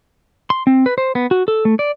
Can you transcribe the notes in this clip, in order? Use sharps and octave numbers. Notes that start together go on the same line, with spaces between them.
C6
C4
B4
C5
B3
F#4
A4
A3
D5